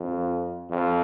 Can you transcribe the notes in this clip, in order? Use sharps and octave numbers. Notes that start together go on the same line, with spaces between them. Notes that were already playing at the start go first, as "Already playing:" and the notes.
Already playing: F2
F2